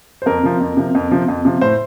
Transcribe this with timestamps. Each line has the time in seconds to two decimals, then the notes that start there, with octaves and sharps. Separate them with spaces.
0.22 C5
0.26 F2 A#4
0.43 C3 F3
0.61 F2
0.77 C3 F3
0.95 F2
1.11 C3 F3
1.28 F2
1.45 C3 F3
1.61 A2 C5